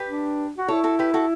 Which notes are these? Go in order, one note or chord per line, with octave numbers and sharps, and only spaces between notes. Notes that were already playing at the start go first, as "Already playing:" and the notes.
Already playing: G4 B4
D4
F#4
E4 A4 C#5
F#4 A4
G4 B4
F#4 A4